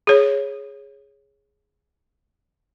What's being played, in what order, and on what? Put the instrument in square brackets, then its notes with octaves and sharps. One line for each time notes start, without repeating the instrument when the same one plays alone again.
[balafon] G#4 C#5